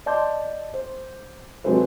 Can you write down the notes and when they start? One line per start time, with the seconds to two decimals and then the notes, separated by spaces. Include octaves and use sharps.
0.06 D5 D#5 A5 C6 D6 G6
0.74 C5
1.64 C3 F#3 G#3 A4 B4 C5